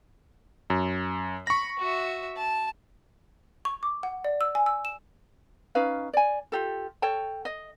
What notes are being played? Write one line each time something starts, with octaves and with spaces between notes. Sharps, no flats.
F#2
B5 C#6 A#6
F#4 E5
A5
C#6
D6
F#5
D5
E6
G#5
E6
E7
C#4 D#4 B4 F5
D5 G#5
F4 G4 A4
A4 C#5 G5 A5
D#5